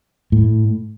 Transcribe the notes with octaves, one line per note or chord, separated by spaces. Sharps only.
A2